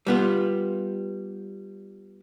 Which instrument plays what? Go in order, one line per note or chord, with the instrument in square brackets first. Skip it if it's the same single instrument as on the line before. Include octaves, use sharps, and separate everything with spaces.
[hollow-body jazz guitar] G3 B3 F4